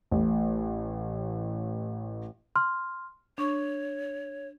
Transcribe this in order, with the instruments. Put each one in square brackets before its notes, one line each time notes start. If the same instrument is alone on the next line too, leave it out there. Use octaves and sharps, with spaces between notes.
[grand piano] A1 A2
[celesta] C6 F6
[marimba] D4 C#6 [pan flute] C#5